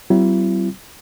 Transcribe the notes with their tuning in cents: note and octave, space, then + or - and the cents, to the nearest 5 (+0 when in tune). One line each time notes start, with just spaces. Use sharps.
G3 -45 C4 -25 E4 +35